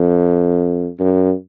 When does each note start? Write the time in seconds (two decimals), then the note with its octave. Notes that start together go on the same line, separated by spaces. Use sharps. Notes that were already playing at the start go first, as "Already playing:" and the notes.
Already playing: F2
1.00 F#2